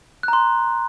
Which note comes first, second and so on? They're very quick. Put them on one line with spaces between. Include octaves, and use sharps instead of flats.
F#6 A#5 C6